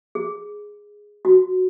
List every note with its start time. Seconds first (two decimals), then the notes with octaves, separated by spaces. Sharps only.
0.15 G#4
1.25 F#4